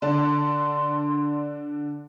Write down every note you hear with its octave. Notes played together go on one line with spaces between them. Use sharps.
D3 D4 A5 C6